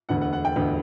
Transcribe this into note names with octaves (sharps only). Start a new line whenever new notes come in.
E1 D2 D3 F#5
F#5
F#5
G5
E1 D2 D3